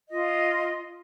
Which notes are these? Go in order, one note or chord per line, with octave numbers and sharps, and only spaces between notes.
F4 D#5